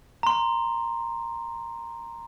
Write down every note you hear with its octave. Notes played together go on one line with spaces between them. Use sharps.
A#5 C6